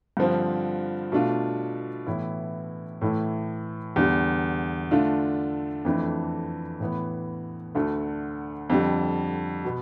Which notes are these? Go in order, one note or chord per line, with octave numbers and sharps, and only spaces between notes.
G2 D3 F3 C4
B2 A3 D4 F4
A2 E3 B3 E4
A2 E3 A3 E4
E2 D3 G3
D3 A3 D4 F4
F2 E3 A3 D4
A2 E3 B3
D2 D3 A3
F2 D3 G3
B2 B3